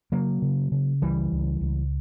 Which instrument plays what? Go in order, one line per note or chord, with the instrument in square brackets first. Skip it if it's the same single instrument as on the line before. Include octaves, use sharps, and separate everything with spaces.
[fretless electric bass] C#3 F#3 A#3
C#3
C#3
C#2 E3 G3
C#2
C#2